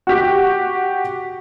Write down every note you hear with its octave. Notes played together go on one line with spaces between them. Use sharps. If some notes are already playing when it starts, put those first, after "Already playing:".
F#4 G4